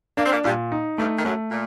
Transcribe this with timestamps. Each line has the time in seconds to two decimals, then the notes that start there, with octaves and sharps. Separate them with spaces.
0.17 A#3 D4
0.25 C4
0.32 A#2 A#3
0.44 G2 A#2 G3
0.72 D#4
0.98 G2 G3 A3
1.18 D#3
1.24 F#2 F#3 A3
1.51 A#2